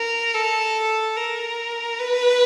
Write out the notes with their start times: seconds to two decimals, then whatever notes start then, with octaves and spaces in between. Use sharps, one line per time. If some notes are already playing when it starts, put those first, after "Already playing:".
Already playing: A#4
0.35 A4
1.17 A#4
1.99 B4